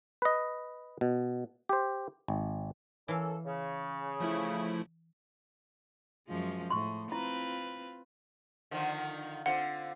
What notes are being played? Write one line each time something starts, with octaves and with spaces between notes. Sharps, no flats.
B4 D#5
B2
G4 C5
G#1
E3 A#3 C#4 A4 F5
C#3
F3 A3 E4
F#2 F3 G#3
A2 C6 C#6
C4 E4 F4 B4
D3 D#3 F3
D3 C4 F4 F#5